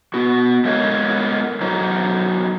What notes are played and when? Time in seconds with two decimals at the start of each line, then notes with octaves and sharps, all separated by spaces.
0.14 B3 F#4
0.65 G#3 A3 B3 F4 A#4 C#5
1.61 F#3 D#4 C5